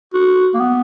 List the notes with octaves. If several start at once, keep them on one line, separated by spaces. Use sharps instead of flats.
F#4
A#3
B3